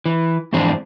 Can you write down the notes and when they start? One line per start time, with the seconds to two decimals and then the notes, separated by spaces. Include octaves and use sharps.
0.06 E3
0.53 F2 G#2 E3 C4 D4